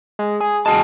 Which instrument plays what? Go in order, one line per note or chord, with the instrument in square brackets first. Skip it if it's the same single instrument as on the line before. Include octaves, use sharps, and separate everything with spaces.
[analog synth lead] G#3
G#4
[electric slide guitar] E2 F#4 A5 [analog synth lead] G#3